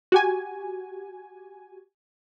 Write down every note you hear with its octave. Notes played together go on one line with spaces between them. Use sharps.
F#4 G4 G#5